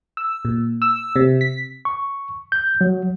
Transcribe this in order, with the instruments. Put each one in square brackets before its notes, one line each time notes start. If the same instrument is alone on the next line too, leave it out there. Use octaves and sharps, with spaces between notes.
[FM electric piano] E6
A#2
E6
C3
B6
[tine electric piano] C#6
G6
F#3